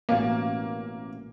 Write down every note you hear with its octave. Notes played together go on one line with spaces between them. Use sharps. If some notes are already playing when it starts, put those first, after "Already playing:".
A1 B2 A#3 C#4